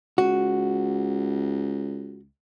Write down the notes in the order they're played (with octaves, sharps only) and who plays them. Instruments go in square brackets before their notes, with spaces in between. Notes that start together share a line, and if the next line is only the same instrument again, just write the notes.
[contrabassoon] C#2 [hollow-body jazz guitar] F#4